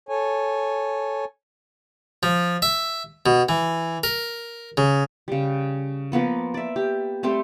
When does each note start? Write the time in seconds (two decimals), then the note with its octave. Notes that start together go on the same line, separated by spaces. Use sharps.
0.09 A4 C#5 G#5
2.23 F3
2.62 E5
3.26 B2
3.49 E3
4.03 A#4
4.77 C#3
5.28 C#3 G3
6.12 F3 A#3 B3 B4
6.54 D5 E5
6.76 G4
7.23 G3 A3 C4 G4